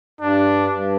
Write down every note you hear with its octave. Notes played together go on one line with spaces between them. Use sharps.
G2 D4
G2